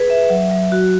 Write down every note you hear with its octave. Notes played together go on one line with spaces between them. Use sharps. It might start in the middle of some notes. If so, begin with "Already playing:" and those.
Already playing: G#4 B4
E5
F#3
F#3
F#4